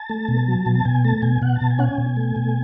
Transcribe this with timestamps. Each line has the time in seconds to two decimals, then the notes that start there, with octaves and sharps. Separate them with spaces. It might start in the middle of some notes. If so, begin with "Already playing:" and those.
Already playing: A5
0.10 A3
0.28 B2
0.48 F#3
0.66 B2
0.75 A5
0.85 B2 G#5
1.04 A3 A5
1.22 B2 G#5
1.42 B2 F#5
1.56 A5
1.61 B2
1.70 G#5
1.79 C#4 F#5
1.84 G#5
1.98 B2
2.17 A3
2.36 B2